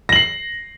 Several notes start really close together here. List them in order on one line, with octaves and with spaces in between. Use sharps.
A#6 F#7 C7